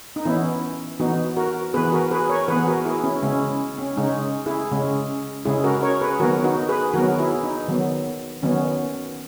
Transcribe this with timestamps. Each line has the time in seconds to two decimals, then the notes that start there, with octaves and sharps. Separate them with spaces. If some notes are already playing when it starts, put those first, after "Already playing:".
0.16 D#4
0.25 E3 B3 C#4 E4
1.00 E3 B3 D#4 F#4
1.36 F#4 A#4
1.74 E3 B3 G#4 B4
1.92 F#4 A#4
2.11 G#4 B4
2.29 A#4 C#5
2.48 E3 B3 G#4 B4
2.67 F#4 A#4
2.85 E4 G#4
3.04 C#4 E4
3.22 C#3 G#3 C#4 E4
3.78 C#4
3.97 C#3 G#3 C#4 D#4
4.46 E4 G#4
4.71 C#3 G#3 C#4
5.45 C#3 G#3 C#4 E4 G#4
5.64 F#4 A#4
5.82 A#4 C#5
6.01 G#4 B4
6.20 D#3 F#3 B3 F#4 A#4
6.44 D#4 F#4
6.69 G#4 B4
6.93 D#3 F#3 B3 F#4 A#4
7.19 E4 G#4
7.43 D#4
7.68 D#3 F#3 B3
8.42 D#3 F#3 B3 C#4